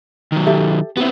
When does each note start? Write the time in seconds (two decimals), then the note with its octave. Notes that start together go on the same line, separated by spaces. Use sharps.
0.32 D#3 F#3
0.46 G4 A4 E5
0.97 B3 C4 E4 F#4